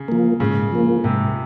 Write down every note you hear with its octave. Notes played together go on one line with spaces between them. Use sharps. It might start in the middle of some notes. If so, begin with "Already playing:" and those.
Already playing: C#3
F3 A#3
G#2 C#3
F3 A#3
G#2 C3